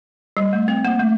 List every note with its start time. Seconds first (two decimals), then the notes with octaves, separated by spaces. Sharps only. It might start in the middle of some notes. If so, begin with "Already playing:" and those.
0.37 G3
0.53 A3
0.68 C4
0.85 A#3
0.99 A3